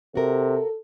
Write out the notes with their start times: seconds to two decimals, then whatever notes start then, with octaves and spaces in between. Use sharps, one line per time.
0.15 C3 F#4 A4 A#4